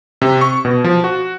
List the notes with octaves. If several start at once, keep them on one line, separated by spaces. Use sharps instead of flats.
C3
C#6
B2
F3
F#4